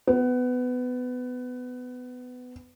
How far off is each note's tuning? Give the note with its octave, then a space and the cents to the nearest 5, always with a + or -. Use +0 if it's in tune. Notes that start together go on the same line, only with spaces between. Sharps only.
B3 +20